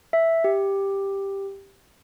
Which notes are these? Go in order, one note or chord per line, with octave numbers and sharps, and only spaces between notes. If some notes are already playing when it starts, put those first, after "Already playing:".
E5
G4